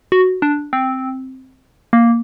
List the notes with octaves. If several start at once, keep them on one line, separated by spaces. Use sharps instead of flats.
F#4
D4
C4
A#3